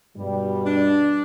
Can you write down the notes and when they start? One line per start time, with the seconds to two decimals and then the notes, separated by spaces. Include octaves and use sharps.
0.17 G2 B2 G3
0.66 D4